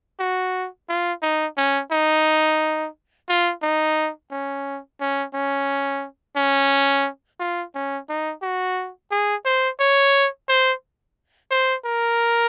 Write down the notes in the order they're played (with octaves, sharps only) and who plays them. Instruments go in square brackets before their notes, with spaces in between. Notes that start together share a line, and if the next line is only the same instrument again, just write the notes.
[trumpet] F#4
F4
D#4
C#4
D#4
F4
D#4
C#4
C#4
C#4
C#4
F4
C#4
D#4
F#4
G#4
C5
C#5
C5
C5
A#4